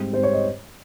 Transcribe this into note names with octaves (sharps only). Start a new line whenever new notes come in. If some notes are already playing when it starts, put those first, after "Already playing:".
Already playing: G#2 G3 C4
G#2 G3 C4 C5
C#5
D#5